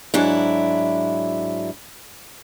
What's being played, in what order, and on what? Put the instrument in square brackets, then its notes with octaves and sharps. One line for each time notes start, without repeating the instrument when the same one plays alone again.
[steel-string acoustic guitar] G#2 F#3 D4 E4